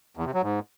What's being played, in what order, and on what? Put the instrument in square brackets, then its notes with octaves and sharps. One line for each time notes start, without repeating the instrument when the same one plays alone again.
[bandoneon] E2
C3
F#3
G#2